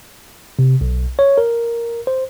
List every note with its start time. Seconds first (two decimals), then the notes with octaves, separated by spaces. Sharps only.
0.59 C3
0.81 B1
1.19 C#5
1.38 A#4
2.07 C5